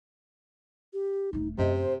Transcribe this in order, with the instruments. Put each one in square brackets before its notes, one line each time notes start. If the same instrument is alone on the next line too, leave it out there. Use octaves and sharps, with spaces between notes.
[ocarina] G4
[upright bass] D#1 A3 [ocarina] D#4
[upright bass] F#2 [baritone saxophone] C3 [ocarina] D#5
[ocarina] C5